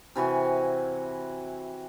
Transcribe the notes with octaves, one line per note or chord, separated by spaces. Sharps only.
C3 E3 F#4 G#5